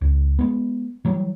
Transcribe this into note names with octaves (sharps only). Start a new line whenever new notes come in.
C#2
G#3 B3
E3 F#3 G3